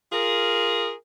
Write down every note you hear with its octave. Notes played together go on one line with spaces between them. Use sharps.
F4 G#4 A#4